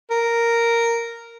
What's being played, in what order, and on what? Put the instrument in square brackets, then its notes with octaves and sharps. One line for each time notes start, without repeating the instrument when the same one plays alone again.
[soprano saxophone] A#4